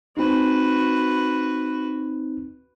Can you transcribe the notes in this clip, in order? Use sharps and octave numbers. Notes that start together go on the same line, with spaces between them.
C4 D#4 F#4 B4